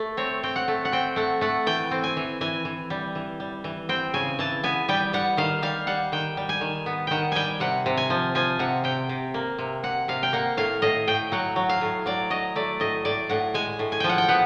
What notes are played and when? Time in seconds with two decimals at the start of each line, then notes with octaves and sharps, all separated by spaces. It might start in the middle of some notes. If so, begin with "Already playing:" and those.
Already playing: A3
0.17 C4 C#5
0.43 C4 G5
0.56 F#5
0.68 A3
0.85 F#5
0.92 C4 G5
1.16 A3 F#5
1.41 A3 F#5
1.66 E3 G5
1.91 C4
2.04 G#5
2.17 E3
2.41 E3 G#5
2.65 E3
2.90 G3
3.15 E3
3.40 G3
3.64 E3
3.89 C4 G5
4.14 C#3 G#5
4.39 E3 A5
4.64 B3 G#5
4.89 G3 G5
5.13 G3 F#5
5.37 D#3 F5
5.62 G3 F5
5.87 G3 F#5
6.12 D#3 G5
6.37 G3
6.49 G#5
6.61 D#3
6.86 B3
7.07 D#3 F#5 G5
7.32 G3 G5 G#5
7.60 C3 F#5
7.86 C3
7.97 G#5
8.10 F3
8.35 F3 G#5
8.59 C3 F#5
8.84 C3 G5
9.09 C3
9.34 A#3
9.58 C3
9.83 C3 F#5
10.08 C3 F5
10.23 G5
10.33 A#3 F#5
10.57 A2 F5
10.82 A2 D#5
11.07 A2 G5
11.32 F#3 F#5
11.56 F#3
11.69 F5
11.81 A2
12.06 F#3 D5
12.30 F#3 D#5
12.56 A3 D5
12.80 A2 D#5
13.05 A2 D5
13.29 A2 F#5
13.54 G#3 G#5
13.79 A2
13.92 G#5
14.00 F3 G5
14.09 F#5
14.18 G5
14.28 B3 F#5